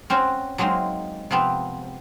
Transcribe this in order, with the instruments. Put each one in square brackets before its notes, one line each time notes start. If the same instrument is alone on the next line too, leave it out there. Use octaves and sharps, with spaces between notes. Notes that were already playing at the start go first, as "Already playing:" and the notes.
[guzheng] C4 C#4 F#4 C5
F#3 G#3 A#3 C4 D#4
C3 F3 B3 C4